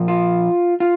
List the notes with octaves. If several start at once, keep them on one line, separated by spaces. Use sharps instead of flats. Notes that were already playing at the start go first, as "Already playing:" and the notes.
Already playing: A#2 F3
F4
F4